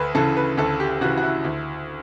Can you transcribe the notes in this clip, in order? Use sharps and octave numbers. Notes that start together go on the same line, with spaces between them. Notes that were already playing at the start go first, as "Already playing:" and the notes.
Already playing: D2 A4 B4
C#3 E3 A4
B4
D2 A4
G4
C#3 E3 F#4
F#4
E4
D2